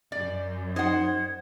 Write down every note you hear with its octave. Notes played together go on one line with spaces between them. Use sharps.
F#2 D5
D#4 C5 F#5 G#6